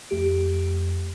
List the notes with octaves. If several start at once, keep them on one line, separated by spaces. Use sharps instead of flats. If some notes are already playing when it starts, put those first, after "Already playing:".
F2 A3 G4 D7